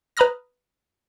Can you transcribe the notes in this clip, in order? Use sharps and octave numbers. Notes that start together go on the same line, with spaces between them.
B4 A#5 B5 D#6 F6 A#6